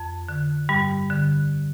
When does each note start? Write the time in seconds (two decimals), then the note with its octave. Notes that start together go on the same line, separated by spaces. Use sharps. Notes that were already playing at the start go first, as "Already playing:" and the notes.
Already playing: F2
0.29 D3
0.69 G2 G3
1.10 D3